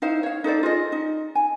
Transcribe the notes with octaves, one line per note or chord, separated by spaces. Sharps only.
D#4 E4 C5 F5
C#5 F5
D#4 A4 C5 D5
F4 G#4 D#5
D#4
G#5